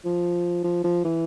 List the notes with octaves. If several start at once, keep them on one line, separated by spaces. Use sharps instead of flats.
F3
F3
F3
E3